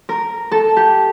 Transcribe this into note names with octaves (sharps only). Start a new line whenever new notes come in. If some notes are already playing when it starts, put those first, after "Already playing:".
A#4
A4
G4